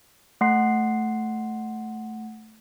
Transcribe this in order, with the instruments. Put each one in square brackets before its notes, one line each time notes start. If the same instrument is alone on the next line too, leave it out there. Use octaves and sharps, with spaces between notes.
[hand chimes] A3 F#5 C6 C7